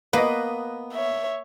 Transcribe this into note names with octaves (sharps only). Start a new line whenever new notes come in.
A#3 B3 B4 D#5
C#5 E5